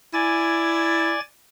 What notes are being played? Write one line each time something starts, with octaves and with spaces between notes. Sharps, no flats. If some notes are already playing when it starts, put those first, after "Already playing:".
E4 D5 G#5 A6